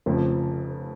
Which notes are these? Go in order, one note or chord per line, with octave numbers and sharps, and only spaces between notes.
F1 F2 C#3 F3